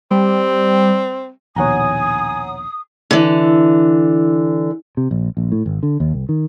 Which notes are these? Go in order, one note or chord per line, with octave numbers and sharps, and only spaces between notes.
G3 C4
A#1 D#2 B2 C#5 F#5 G#5 A#5 D#6
D3 E3
C3
A#1
A#1
A2
G#1
D3
D#2
C2
D#3